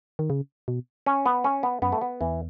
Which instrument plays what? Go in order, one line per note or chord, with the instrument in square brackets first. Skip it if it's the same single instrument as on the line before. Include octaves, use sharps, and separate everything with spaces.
[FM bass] D#3
C#3
B2
[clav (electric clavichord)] C#4
B3
C#4
B3
[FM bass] F#2 [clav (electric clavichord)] B3
[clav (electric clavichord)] A3
B3
[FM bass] E2 [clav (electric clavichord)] E3